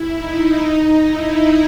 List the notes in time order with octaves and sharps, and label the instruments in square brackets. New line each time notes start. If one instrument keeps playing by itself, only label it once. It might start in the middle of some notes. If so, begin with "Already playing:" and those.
Already playing: [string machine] E4
D#4
E4